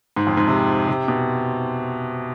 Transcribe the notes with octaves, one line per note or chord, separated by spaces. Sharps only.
G#2
F2
G#2
C3
C3
B2